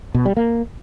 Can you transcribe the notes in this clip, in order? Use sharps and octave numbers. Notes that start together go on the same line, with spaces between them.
B2
G3
A#3